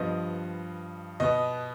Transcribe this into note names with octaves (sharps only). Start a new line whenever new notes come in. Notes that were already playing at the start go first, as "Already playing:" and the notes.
Already playing: G2 F3 B3 D#5
B2 B3 D#5